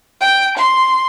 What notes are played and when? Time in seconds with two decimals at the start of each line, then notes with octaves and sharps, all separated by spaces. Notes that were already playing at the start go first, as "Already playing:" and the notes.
0.21 G5
0.58 C6